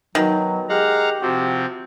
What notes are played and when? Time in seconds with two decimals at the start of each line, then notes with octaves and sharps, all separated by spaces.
0.15 B2 D#3 F#3
0.69 G#3 G4 F5 F#5 A#5
1.22 C3 F3 C4 F#4